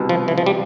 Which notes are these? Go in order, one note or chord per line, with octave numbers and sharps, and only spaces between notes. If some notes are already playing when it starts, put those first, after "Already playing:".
Already playing: C2 B2
F3
E3
F3
G3